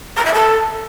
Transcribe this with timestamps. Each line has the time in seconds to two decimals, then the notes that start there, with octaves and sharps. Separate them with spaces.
0.16 A#5
0.25 E5
0.33 A4